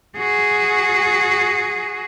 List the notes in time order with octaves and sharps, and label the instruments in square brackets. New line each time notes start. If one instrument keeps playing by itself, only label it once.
[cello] F#4 G#4